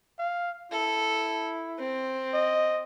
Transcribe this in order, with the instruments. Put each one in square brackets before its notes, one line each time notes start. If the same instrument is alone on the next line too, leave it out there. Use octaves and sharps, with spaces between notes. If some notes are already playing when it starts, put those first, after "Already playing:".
[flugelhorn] F5
[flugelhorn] E4 [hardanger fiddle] A4
[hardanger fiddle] C4
[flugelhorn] D#5